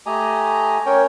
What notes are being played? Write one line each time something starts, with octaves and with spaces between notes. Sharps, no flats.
A3 G4 D#5 G#5 A#5
C#4 A#4 C#5 G5